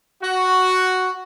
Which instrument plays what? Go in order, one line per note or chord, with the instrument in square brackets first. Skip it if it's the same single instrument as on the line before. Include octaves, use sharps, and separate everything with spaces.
[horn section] F#4